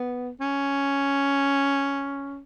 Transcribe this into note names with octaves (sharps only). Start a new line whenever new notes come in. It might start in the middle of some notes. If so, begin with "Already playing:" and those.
Already playing: B3
C#4